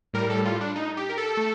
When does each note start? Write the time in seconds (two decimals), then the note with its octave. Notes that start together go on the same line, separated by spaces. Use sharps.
0.13 A2 G3 A#4
0.30 A4
0.45 F4
0.61 D4
0.75 D#4
0.97 G4
1.09 A#4
1.18 A4
1.37 A3